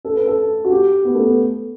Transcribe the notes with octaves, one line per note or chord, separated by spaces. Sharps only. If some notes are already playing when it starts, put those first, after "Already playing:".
A4
B4
A4
F#4
G4
B3
A3
B3